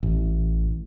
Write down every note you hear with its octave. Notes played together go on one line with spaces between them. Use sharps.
A1